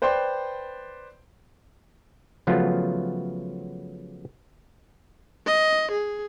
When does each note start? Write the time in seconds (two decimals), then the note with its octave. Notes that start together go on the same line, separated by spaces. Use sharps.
0.02 B4 C5 D5 G5 C6
2.47 C#3 F3 F#3 A3 B3 F4
5.47 D#5
5.91 G#4